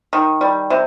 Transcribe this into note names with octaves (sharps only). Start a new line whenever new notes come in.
D#3
G3
C3